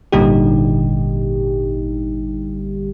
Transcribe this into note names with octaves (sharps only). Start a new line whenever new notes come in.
G#1 A#2 D3 G3 D#4 G4